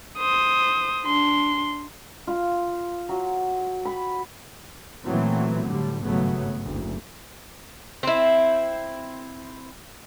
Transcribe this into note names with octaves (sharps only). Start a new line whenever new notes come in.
C5 D#6
D4 C6
F4
F#3
B5
A#2 E3 F#3 A3 B3 C4
A2 D3 G3
G#1 G2 C#3 F#3 A3 B3
F#1 D2
C4 E4